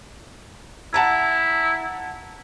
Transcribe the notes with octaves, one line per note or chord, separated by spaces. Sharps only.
E4 F#5 A5 A#5